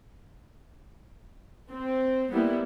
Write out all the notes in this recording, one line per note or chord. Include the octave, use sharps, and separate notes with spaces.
C4
G3 A#3 B3 E4